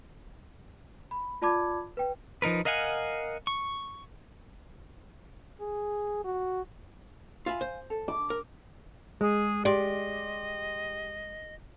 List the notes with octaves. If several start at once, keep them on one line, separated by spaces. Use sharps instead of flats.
B5
F4 D5 A5 B5 D6 G#6
B4 G5
F3 D#4 A#4 B4
A#4 D#5 F5 F#5 G#5
C#6
G#4
F#4
F4 E5 F5 G#5 B5
C5
A4
D6
A#4
G#3 G#4
G4 D5 D#5 C6